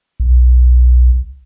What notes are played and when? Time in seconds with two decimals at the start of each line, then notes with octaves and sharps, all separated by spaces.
0.20 B1